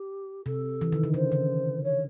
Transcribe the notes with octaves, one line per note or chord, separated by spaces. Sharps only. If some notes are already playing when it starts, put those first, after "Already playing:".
Already playing: G4
C3 A4
E3
D#3
D3
C#3 C5
C#3
C#5